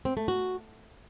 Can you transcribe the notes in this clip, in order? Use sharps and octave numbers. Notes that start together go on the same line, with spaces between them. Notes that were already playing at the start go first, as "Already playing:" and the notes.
C4
A3
F#4